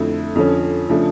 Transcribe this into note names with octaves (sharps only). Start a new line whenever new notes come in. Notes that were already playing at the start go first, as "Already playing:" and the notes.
Already playing: F2 D3 A3 E4
F2 D3 F3 C#4
C#3 F3 A3 D4